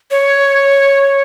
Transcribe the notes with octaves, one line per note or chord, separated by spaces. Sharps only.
C#5